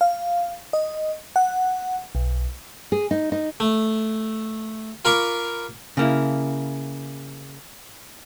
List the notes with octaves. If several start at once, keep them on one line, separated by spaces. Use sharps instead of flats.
F5
D#5
F#5
B1
G#4
D#4
D#4
A3
F4 A#4 F5 B5 C#6 D6
C#3 A#3 E4